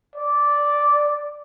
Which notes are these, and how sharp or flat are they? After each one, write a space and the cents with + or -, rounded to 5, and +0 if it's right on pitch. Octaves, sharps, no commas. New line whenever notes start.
D5 -10